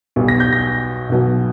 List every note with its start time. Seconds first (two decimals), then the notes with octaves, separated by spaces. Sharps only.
0.16 B1 B2 G3
0.28 A#6
0.40 G6
0.53 A#6
1.09 B1 B2 F#3